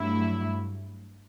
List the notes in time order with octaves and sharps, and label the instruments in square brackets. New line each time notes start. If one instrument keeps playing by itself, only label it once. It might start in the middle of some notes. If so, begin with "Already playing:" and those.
Already playing: [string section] G2 F#3 A3 E4